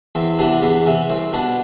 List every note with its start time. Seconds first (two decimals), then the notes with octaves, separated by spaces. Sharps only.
0.15 E2 C4
0.39 C3 E3 B3 D4
0.62 E2 B3
0.86 C3 E3
1.09 C2 C4
1.33 B2 B3 D4